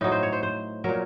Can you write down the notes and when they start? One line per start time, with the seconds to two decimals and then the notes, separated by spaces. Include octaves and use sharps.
0.01 A2 F#3 D#4
0.12 C5
0.23 C#5
0.33 C5
0.43 C5
0.84 A#2 F#3 A#4